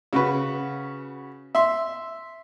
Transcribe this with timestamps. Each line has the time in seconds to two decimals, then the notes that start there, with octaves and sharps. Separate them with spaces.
0.13 C#3 F#4 B4
1.55 E5 C6